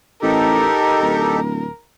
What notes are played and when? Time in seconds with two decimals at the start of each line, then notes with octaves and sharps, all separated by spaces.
0.22 A1 D#4 G4 A4 A#4
1.01 D1